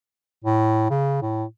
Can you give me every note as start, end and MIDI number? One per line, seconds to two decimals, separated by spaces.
0.44 0.86 45
0.90 1.19 49
1.22 1.44 45